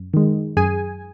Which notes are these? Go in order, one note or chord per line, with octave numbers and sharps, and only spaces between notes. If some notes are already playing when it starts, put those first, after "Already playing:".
Already playing: F#2
D#3 G#3
F#2 G#4 G#5